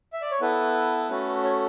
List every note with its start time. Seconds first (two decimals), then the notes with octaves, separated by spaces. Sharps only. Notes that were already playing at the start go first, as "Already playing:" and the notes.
0.13 E5
0.22 D5
0.31 C#5
0.41 B3 E4 A4 B4
1.10 A3 C#4 F#4 A4
1.44 C#5